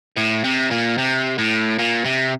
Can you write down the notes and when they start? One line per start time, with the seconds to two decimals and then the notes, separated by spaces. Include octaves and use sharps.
0.17 A2
0.44 C3
0.71 A#2
0.98 C3
1.38 A2
1.79 A#2
2.05 C3